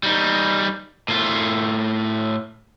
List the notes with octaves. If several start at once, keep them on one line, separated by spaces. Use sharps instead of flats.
G3 D#4
A2 F4